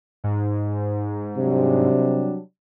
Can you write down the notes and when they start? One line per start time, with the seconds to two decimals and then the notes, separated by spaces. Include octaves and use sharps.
0.24 G#2
1.37 C3 F#3 G3 D4